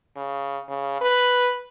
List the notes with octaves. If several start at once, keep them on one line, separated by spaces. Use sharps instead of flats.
C#3
C#3
B4